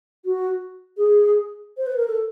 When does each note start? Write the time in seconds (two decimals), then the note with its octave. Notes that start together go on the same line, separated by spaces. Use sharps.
0.25 F#4
0.97 G#4
1.77 C5
1.87 B4
1.97 A#4
2.07 A4